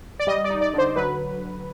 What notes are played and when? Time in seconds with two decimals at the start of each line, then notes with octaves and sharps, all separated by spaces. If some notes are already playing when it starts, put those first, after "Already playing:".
0.20 D5
0.27 G3 D#5
0.44 D5
0.50 D#4
0.61 D5
0.74 D3 C5
0.96 F#3 B4